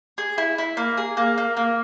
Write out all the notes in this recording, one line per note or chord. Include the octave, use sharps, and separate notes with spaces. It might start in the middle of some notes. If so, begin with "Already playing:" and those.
G#4
E4
E4
A#3
G#4
A#3
A#3
A#3